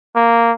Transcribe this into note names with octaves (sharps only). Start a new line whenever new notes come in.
A#3